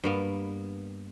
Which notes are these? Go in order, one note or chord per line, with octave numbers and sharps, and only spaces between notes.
G2 A#3 B3